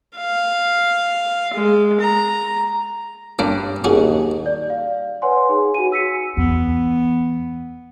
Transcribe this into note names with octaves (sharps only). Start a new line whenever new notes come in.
F5
G#3
A#5
G2 A#3 C#4 D4
D#2 C#4 F#4 G#4
D5
F5
B4 C#5 F#5 G#5 C6
D#4 G#4
F#4 G#5 D#7
E6 B6 C#7 D#7
E2 B3